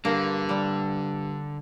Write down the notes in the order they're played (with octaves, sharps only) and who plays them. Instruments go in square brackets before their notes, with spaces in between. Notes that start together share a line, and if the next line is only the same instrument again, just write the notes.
[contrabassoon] G2 [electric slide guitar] D3 [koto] A#3
[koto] G3